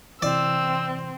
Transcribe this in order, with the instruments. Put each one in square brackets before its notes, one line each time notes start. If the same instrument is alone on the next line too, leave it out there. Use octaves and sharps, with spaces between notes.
[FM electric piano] C3 E3 [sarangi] C4 [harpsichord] D5 [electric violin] E6